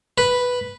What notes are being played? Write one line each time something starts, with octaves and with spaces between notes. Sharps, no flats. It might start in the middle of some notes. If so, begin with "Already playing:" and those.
B4